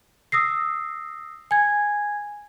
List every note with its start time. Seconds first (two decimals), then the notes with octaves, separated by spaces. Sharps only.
0.32 D#6 E6 A#6 C7
1.51 G#5 G#6